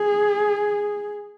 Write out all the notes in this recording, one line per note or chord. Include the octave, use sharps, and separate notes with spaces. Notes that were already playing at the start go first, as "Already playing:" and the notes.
Already playing: G#4